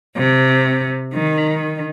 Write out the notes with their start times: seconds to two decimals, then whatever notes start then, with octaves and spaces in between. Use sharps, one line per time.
0.17 C3
1.12 D#3